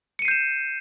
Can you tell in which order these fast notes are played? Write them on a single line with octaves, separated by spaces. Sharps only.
C#7 D#7 C7 G6 E7